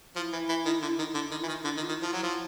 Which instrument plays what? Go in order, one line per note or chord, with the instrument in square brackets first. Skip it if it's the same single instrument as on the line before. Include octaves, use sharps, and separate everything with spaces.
[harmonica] F3 [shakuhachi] E4
[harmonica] E3
E3
D#3
D3
D#3
[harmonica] D3 [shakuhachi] E4
[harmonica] D#3
[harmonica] E3 [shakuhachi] F4
[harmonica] D#3
[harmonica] D3 [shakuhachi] E4
[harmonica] D#3
[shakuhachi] F4
[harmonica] D#3
[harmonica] F3 [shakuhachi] E4
[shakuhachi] F4
[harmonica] F#3 [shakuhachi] E4
[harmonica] F3